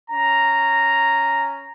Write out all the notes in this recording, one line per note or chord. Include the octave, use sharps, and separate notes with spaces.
C#4 A#5